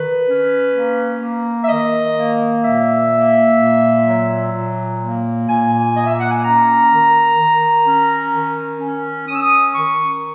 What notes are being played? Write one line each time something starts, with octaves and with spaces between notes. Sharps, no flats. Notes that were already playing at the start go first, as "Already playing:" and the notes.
Already playing: D#3 B4
C#4
A#3
A#3
E5
D#3 D#5
A#3
A#2 E5
A#3
A#2
F#3
A#2
A#3
A#2 G#5
A#3 D#5
E5
F#5
G#5
C#4 A#5
D#3
D#3
C#4
D#3
C#4
C#4 D#6
E6
D#6
D#3 C#6